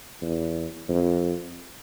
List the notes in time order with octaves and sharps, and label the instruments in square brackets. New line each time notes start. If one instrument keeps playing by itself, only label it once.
[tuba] E2
F2